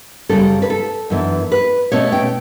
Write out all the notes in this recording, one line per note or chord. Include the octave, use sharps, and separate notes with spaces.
F#2 C#3 G3 C#4 A4
B4
A4
F#2 E3 B3 D4
B4
B2 A3 C#4 C#5
G5